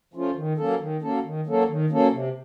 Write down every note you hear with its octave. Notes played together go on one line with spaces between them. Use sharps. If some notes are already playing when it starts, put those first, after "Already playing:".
F3 A3 C#4 F4
D#3
F#3 A#3 C#4 A4
D#3
F#3 A#3 C#4 A4
D#3
F#3 A#3 C#4 A4
D#3
F#3 A#3 C#4 A4
C3